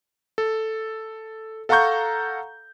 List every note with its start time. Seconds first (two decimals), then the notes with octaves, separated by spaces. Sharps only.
0.38 A4
1.69 A4 F5 F#5 A#5 C#6 G6